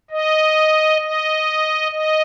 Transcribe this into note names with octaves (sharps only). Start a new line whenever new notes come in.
D#5
D#5
D#5